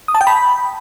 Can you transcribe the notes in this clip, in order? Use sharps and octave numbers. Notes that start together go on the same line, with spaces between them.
D#6
A5
G5
B5